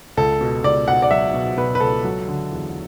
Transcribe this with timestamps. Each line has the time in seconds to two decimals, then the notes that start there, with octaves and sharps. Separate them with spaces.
0.17 C#2 A4
0.41 B2
0.64 C#2 D5
0.88 B2 F#5
1.02 D5
1.11 F#3 E5
1.34 B2
1.57 B2 B4
1.75 B4
1.80 C#2 A4
2.04 F#3
2.28 D3
2.51 E2